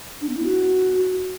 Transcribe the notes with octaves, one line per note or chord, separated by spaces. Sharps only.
D4
B3
E4
F#4